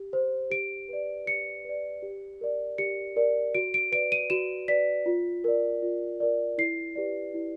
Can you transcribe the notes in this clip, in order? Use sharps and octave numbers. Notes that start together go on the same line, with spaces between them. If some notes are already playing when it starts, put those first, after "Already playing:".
Already playing: G4
C5
G4 D7
B4 D5
G4 C#7
B4 D5
G4
A#4 D5
G4 C#7
A#4 D5
F#4 D7
D7
B4 D5 D7
D#7
F#4 E7
B4 D5 B6
F4
A#4 D5
F4
A#4 D5
E4 C7
G4 B4 D5
E4